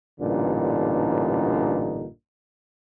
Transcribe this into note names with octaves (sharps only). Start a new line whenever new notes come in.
A1 G2 A#2 D3 D#4